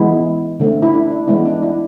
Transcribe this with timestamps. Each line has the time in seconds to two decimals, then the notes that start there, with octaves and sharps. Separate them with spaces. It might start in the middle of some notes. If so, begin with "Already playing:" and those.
Already playing: E3 G#3 B3 E4
0.60 D3 A3 C4
0.82 E4
0.94 D4
1.11 D4
1.27 E3 G#3 B3 E4
1.46 D4
1.62 E4